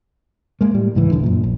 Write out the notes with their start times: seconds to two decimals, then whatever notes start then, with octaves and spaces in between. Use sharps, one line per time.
0.61 G#3 A#3
0.74 A2 G3
0.95 C#2 G#2 E3
1.11 D#1 A#1 D3
1.23 F#2 A#2
1.44 A#1